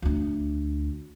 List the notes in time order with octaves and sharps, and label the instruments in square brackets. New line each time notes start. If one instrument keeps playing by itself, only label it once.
[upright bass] D2 D4